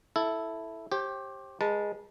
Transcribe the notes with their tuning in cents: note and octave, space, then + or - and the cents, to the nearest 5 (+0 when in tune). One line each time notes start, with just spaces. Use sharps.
E4 +0 A4 +0
G4 -5 C5 +40
G#3 -10 B4 -40 A5 +0